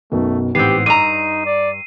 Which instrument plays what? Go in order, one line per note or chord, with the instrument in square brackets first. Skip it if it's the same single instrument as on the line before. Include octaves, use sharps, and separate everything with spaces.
[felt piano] B1 F#2 B2 [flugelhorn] A3
[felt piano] A1 G#2 [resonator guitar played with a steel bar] B3 C4 [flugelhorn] G4 [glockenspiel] C7
[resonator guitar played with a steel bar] G2 A#5 [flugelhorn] D#4 [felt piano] E6 [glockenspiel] D#7
[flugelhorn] D5